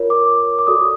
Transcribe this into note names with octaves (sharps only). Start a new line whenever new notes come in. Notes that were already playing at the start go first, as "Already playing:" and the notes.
Already playing: F4 A#4 C#5
D6
D6
F#4 A4 D5 D#6